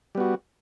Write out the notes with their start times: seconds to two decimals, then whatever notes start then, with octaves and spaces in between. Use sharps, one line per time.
0.15 G3
0.18 B3
0.20 F#4